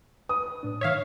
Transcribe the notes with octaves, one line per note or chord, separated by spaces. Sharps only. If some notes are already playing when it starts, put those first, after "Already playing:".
B4 D#6
A2 D4
G#2 D#3 C#5 E5 F5